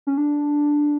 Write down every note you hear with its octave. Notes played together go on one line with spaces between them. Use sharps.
C#4
D4